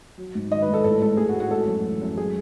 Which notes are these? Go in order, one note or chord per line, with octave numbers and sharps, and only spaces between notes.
F#3
G#2
D#3 D#5
B4
G#2
A4
A2 A4
G#3 A4
G#3 G#4
F#4
A2
F#4
G#3 A4
F#2
E3
F#2
G#3 G#4